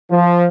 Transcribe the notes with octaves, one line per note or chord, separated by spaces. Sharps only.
F3